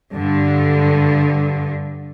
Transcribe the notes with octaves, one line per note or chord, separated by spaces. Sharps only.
G2 D3